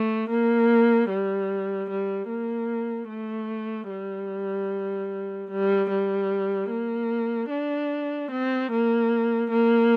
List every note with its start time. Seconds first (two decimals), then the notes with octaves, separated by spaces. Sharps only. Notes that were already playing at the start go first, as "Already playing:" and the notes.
Already playing: A3
0.30 A#3
1.09 G3
1.90 G3
2.30 A#3
3.10 A3
3.90 G3
5.51 G3
5.90 G3
6.70 A#3
7.50 D4
8.32 C4
8.72 A#3
9.51 A#3